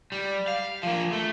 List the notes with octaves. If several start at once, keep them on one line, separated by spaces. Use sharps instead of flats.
G3
F5
F3 A#3
A3